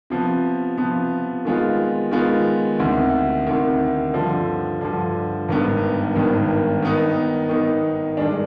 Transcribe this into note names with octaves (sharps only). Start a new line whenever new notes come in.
C3 F3 B3
C3 F3 B3
D#3 G#3 B3 F4
D#3 G#3 B3 F4
D2 C3 D#3
D2 C3 D#3
G2 D3 F3
G2 D3 F3
G#1 G2 D#3 B3
G#1 G2 D#3 B3
D#3 B3 D#4
D#3 B3 D#4
G2 D#3 G#3 D4